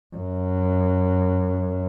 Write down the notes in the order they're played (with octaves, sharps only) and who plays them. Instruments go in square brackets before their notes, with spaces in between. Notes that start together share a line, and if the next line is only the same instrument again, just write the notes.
[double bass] F#2